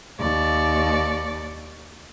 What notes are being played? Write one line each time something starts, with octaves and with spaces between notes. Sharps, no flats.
D#2 D5 C#6